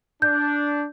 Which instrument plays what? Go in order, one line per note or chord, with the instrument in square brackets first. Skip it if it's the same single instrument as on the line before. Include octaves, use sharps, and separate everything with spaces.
[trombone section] D4 [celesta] G6